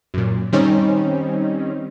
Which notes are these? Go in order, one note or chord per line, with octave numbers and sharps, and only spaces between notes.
F#2 A#2
D#3 G3 C4 C#4 D#4